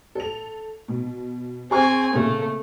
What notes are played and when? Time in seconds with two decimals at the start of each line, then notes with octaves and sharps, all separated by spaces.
0.15 A4 F7
0.88 B2
1.71 C4 G#4 G#5 C#6
2.13 C#3 A3 A#3